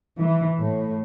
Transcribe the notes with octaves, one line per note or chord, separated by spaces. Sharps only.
E3
A2